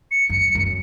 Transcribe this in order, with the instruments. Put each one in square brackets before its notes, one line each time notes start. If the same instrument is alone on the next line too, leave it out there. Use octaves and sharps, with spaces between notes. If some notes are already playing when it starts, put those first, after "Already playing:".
[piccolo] C#7
[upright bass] F#2
F#2